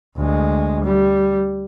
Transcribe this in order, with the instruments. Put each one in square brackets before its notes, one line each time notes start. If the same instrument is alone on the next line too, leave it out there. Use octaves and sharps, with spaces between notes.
[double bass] D2 G#3
G3